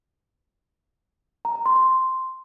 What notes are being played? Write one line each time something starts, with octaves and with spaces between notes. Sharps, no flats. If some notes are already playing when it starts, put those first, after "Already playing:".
A#5
A#5
C6
C6